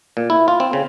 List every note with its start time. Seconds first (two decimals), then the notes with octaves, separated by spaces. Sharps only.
0.17 A#2
0.30 E4
0.48 F4
0.60 C4
0.73 C#3